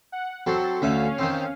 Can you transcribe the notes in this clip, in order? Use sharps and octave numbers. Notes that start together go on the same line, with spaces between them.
F#5
F#3 C4 A4
D2 C#4 E5 F5
D#3 C4